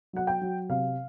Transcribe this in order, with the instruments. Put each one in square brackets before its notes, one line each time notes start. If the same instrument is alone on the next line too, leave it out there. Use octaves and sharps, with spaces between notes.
[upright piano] F#3 F#5
G5
F#3
C3 F5